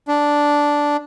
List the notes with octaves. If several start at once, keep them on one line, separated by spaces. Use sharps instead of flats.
D4